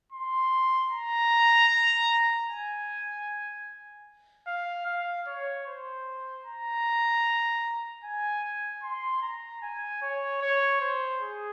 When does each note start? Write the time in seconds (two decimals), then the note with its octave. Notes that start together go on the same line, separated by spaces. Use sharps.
0.12 C6
0.91 A#5
2.49 G#5
4.47 F5
4.86 F5
5.27 C#5
5.67 C5
6.45 A#5
8.04 G#5
8.83 C6
9.22 A#5
9.62 G#5
10.02 C#5
10.42 C#5
10.81 C5
11.21 G#4